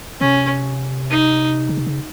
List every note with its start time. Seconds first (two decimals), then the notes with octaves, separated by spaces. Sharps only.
0.20 C3 C#4
1.10 D#4
1.69 C#3
1.77 C3
1.86 C#3